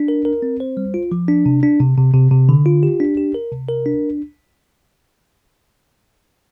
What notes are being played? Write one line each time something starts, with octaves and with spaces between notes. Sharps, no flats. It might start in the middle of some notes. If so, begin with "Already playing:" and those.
Already playing: D4
A#4
A#4
C4
C5
G3
F4
F3
D4
C3
D4
C3
C3
C3
C3
D3
F4
G4
D4
G4
A#4
C3
A#4
D4